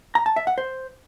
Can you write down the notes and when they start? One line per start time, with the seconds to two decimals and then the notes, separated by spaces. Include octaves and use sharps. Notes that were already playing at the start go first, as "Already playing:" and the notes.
0.15 A#5
0.26 A5
0.36 E5
0.47 F#5
0.58 C5